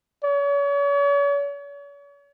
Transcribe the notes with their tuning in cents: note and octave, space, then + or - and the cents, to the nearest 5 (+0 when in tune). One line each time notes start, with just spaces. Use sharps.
C#5 +40